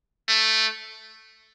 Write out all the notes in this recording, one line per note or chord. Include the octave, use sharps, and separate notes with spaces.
A3